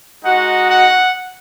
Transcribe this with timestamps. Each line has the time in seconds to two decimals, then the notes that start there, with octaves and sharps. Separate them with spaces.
0.24 G#3 D#4 F#4 F#5
0.70 F#5